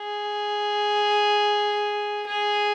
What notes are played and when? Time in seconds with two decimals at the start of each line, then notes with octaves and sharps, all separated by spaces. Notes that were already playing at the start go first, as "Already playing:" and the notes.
Already playing: G#4
2.26 G#4